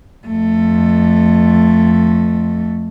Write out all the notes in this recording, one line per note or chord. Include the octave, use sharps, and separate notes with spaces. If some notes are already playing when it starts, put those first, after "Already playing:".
F2 A3